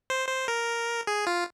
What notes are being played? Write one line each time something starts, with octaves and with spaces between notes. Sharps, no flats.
C5
C5
A#4
G#4
F4